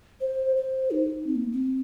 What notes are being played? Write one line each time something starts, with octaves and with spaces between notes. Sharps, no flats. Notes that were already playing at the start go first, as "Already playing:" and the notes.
C5
C5
D#4
C4
A#3
C4